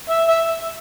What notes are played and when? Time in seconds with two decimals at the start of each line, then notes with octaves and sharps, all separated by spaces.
0.10 E5
0.29 E5